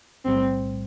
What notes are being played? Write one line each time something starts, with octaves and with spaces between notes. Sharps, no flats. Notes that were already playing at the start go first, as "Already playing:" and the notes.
B1 A2 G3 C4